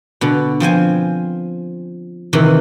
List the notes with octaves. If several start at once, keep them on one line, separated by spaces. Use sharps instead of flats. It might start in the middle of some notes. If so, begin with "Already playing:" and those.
B2 D3
F3 C4 C5 G#5
C3 D#3 E3